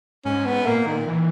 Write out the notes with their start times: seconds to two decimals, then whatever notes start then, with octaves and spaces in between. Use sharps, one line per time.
0.25 G#2 C#4
0.46 B3
0.66 A#2 A#3
0.87 D#3
1.07 E3